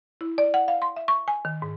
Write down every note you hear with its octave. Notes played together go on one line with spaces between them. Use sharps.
E4
D5
F#5
F5
C6
E5
C#6
G#5
D#3
G#2